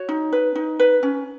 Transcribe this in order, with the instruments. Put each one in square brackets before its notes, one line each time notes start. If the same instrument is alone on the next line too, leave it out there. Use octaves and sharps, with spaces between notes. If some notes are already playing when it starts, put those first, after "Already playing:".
Already playing: [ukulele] F#4 C#5
D#4
B4
D#4
B4
C#4